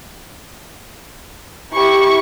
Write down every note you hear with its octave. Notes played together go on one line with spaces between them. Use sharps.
E4 G4 C#6